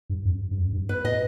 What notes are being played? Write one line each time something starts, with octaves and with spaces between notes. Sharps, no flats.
G2
F#2
G2
F#2
G2
B4
A2 D#5